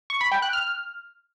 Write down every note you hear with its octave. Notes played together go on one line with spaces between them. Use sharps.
C#6
B5
G5
F#6
F6